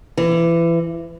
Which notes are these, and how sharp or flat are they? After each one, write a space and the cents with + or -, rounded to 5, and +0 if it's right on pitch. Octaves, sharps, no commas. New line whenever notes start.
E3 +25